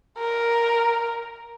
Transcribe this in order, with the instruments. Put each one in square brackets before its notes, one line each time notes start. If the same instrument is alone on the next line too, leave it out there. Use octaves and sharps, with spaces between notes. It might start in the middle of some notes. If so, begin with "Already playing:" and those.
[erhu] A#4